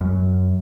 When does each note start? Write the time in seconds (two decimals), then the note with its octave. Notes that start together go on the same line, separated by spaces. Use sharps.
0.01 F#2